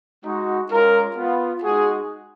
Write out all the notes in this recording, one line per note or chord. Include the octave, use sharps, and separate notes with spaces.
G#3 D#4 F#4
G#3 C#4 F4 A#4
B3 F4
G#3 D#4 F#4 G#4